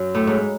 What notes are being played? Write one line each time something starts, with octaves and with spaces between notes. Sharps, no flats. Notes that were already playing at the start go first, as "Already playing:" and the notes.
Already playing: F#2
A2
G#2